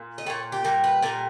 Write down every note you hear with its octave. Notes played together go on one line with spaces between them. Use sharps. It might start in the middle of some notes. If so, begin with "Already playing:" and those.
Already playing: A#2
D#5
A#2 G3 C#5
G4
A#2 G3 A#4
B4
A#2 G3 A#4